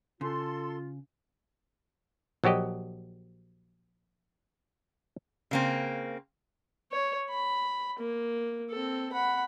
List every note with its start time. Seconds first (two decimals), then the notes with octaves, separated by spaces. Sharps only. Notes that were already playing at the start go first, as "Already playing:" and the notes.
0.21 C#3 F4 A4 C6
2.44 A#1 F#3 F#4 G4 D#5
5.51 C#3 A#3 C4
6.92 C#5
7.30 B5
8.00 A#3
8.71 C4 A4
9.12 F#5 B5